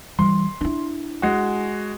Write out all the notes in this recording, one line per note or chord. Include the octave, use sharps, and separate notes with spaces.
E3 G3 C6
D4 E4
G#3 F#4